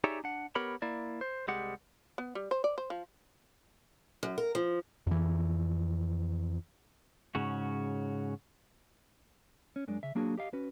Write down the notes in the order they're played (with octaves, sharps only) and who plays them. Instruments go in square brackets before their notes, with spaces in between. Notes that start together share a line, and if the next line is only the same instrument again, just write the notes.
[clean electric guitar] D#4 G4 G#4 C#5 D5 E5
D4 F#5
B3 G4 A#4 C#5 B5
A#3 E4 D5
C5
C2 G3 G#3 G4 F#5
[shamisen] B3
G3
C5
D5
C5
F3
[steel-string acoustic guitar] F#2
A#4
F3
[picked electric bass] F2 E3
[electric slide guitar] G#2 C#3 C#4 F#4
[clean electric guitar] C#4
F#2 G#3 D4
C#3 E5
F#3 A#3 D4 F#4 G#4
G4 D#5 F5
C#4 F#4 B4